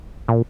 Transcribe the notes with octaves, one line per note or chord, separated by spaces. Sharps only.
A#2